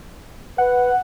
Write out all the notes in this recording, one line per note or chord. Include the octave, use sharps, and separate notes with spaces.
B4 F#5